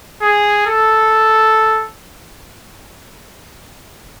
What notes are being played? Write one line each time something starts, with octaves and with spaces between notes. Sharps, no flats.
G#4
A4